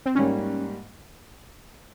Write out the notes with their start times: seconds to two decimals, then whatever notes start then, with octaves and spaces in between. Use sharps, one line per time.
0.06 C4
0.15 G#2 G3 A#3 C#4